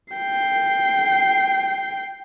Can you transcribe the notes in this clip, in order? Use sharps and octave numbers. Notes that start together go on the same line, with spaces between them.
G5 C7